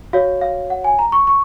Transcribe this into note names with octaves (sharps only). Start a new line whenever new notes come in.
F#4 C#5 F5
F5
F#5
G#5
A#5
C#6
C#6